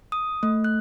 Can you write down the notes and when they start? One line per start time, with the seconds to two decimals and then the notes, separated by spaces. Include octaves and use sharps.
0.12 D#6
0.43 A3
0.64 F#6